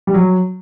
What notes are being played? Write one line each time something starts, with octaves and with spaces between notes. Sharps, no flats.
G3
F#3